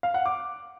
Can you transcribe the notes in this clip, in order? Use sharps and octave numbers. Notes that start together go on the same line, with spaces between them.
F5
F#5
D6